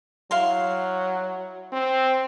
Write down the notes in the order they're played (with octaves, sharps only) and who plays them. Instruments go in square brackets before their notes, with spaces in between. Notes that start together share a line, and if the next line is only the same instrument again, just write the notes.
[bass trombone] F#3 [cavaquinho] E4 F5 C6
[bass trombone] C4